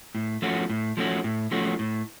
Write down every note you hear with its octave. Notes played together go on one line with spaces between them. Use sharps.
A2
F3 A3 C#4 F#4
A2
F3 A3 C#4 F#4
A2
F3 A3 C#4 F#4
A2